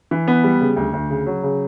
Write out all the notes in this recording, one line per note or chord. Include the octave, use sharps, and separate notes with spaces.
E3
B3
G3
C#3
D2
D2
C#3
F#3
C#3